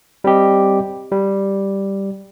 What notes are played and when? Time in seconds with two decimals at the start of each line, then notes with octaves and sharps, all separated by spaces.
0.24 G3 C4 G4 D#5
1.12 G3